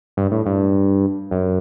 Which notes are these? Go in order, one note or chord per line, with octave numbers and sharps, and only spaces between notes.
G2
A2
G2
F#2